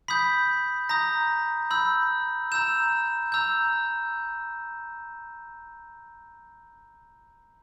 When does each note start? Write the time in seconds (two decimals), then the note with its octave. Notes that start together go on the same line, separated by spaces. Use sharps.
0.08 B5 D#6 G6 B6
0.89 A#5 D#6 G6 A#6
1.71 B5 E6 G6
2.52 A#5 E6 G6 E7
3.32 A#5 E6 G6